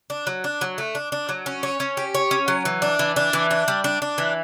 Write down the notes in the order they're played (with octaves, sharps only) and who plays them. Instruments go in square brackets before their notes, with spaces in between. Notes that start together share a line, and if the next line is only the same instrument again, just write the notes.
[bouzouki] D4
F#3
D4
F#3
A3
D4
D4
F#3
C#4
C#5
C#4
G4
C#5
C#4
F#3
E3
D4
E3
D4
E3
D4
G3
D4
D4
E3